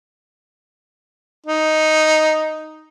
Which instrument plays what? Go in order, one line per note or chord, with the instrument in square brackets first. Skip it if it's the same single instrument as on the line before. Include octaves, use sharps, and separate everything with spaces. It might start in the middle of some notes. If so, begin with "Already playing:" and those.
[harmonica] D#4